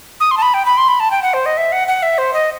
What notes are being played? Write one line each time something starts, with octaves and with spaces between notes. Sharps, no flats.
D#6
C6
A5
B5
G5
B5
C6
B5
A5
G5
F#5
C5
D#5
E5
F#5
F#5
E5
C5
D#5